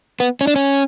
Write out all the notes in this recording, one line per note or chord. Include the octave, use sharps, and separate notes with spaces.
B3
C#4
D4
C#4